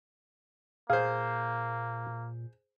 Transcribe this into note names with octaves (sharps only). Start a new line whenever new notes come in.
A#2 A#3 G#4 C5 F5